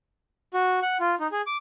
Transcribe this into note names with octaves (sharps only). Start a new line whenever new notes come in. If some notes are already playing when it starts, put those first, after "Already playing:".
F#4
F#5
F4
D#4
G#4
D6